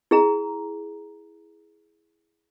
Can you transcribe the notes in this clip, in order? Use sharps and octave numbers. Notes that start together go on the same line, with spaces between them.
E4 G#4 A#5